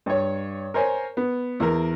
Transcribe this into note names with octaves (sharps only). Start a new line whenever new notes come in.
G2 C#5
A#4 C5 C#5 G#5
B3
E2 A#4